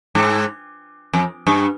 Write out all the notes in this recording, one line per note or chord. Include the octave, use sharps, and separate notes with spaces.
G#2
F2
G2